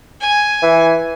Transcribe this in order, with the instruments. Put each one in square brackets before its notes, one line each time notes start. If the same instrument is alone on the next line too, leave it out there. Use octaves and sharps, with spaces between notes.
[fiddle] G#5
[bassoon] E3